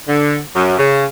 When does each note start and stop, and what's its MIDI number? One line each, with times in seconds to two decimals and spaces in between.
0.07 0.37 50
0.55 0.75 42
0.77 1.05 49